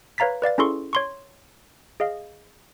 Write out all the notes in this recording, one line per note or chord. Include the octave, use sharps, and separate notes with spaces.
B4 C#5 F5 A#5 A6 B6
B4 D5 F5 A6
C#4 E4 G#4 A4 C6 C#6
C#5 C6 C#6
G#4 D#5 F5